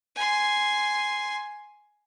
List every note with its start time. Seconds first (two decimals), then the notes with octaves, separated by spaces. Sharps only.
0.15 G#5 C6